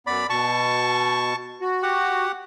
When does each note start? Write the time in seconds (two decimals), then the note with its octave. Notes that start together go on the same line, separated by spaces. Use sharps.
0.07 F#2 B3 D5 B5
0.30 B2 A5 C#6
1.61 F#4
1.83 G4 F#5